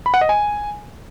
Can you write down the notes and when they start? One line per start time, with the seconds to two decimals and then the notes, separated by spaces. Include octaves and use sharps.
0.06 B5
0.14 F#5
0.21 D#5
0.29 G#5